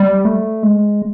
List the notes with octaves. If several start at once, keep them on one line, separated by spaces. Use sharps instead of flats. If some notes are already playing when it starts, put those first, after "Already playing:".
Already playing: G3
A3
G#3